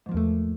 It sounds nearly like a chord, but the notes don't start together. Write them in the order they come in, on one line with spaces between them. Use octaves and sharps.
G#2 F3 A#3 E2 A3